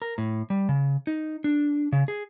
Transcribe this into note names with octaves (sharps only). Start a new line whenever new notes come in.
A#4
A2
G3
C#3
D#4
D4
C#3
G#4